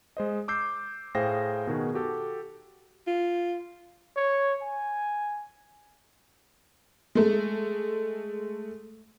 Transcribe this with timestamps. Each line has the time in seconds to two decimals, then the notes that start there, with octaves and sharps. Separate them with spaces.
0.17 G#3 C5 D#5
0.48 D6 E6 G6 C7
1.15 A2 G#4 C5 F5 G5 A#6
1.67 B2 D#3 F#4 G#4
1.94 F#4 G4 A4
3.07 F4
4.16 C#5
4.62 G#5
7.15 G#3 A3